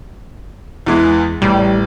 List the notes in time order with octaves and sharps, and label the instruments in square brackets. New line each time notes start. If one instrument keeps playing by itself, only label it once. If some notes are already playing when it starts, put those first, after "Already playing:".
[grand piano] E2 E3 G#3
[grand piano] A1 [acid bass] G3